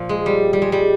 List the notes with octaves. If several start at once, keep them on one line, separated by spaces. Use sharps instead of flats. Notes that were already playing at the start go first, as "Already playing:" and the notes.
Already playing: A#2 F3
G#3
G3
G3
G#3
G3